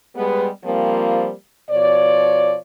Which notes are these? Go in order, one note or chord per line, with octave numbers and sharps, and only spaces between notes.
G3 G#3 B3
F3 G3 A#3 C4 F4
B2 F3 C#5 D5